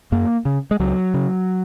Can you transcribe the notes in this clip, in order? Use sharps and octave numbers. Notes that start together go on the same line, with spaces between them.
F#2 A#3
C#3
G#3
C#2 F#3
C#3